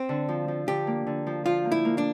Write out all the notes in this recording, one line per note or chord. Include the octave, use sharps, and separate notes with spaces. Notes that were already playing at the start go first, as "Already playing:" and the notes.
Already playing: C4
D3
F3
F3
D3 G4
A#3
D3
F3
F3 F4
A#3
E4
A#3
D4